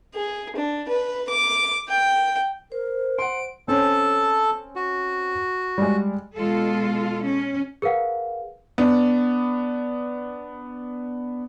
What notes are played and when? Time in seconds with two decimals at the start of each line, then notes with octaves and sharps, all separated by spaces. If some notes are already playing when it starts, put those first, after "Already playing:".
0.15 G#4
0.56 D4
0.88 B4
1.29 D6
1.88 G5
2.72 A#4 C5
3.19 F#5 C6 D7
3.68 C4 C#4 A4 C#5 A5
4.76 F#4
5.78 G3 G#3
6.37 B2 G#3 F4 A4
7.25 C#4
7.82 G#4 A#4 B4 F5 F#5
8.78 B3 D4